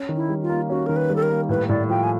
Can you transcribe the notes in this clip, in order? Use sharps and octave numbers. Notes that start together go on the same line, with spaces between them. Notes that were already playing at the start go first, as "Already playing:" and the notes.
Already playing: C#4
D#3
E4
G3
F4
A#3
C#4 F#4
D#3 A#4
B4
G3
A4
A#4
A#3
A2 B4
A2 D5
F3 G5
G#5